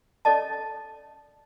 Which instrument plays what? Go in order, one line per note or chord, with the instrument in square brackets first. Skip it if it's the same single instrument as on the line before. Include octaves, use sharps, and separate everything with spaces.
[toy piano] C#4 A4 D5 D#5 A5